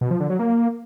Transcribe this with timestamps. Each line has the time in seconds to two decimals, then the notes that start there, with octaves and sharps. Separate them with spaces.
0.01 B2
0.11 F3
0.20 D3
0.30 F#3
0.39 A#3